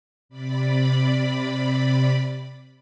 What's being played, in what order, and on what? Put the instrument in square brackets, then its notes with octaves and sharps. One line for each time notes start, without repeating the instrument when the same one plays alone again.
[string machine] C3 D5 B5